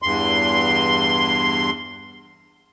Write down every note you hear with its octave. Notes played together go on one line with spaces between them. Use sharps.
E2 G2 C6